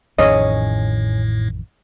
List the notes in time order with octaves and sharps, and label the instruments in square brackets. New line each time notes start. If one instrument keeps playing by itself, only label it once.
[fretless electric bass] A1 F2 D#3 [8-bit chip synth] A2 [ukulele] C#4 G#4 C#5 [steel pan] D#5